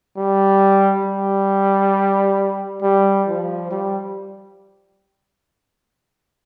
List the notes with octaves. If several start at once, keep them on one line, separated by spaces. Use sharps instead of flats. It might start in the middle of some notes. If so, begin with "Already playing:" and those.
G3
G3
G3
F3
G3